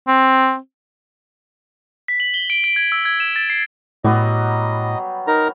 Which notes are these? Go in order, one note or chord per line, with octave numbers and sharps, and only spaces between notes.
C4
B6
F#7
G7
D7
D7
G#6
E6
G#6
E7
A6
C7
A2 F#3 G3 B3 D#5
D#4 A#4 A#5